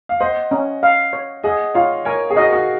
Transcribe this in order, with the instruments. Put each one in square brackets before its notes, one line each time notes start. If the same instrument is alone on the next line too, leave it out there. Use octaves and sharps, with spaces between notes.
[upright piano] F5
[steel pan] C5 [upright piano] D#5 F#5
[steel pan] C#4
F5
C#5
[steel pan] G#4 [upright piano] D#5 F#5
[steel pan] F4 [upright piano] C#5 F5
[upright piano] A#4 C#5 [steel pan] G#5
[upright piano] G#4
[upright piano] F#4 A#4 [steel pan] D#5
[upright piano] F#4